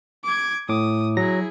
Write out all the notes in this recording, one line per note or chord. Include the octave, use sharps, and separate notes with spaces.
D6 G#6
A2 D6 D#6
F#3 E4 G#4 A#6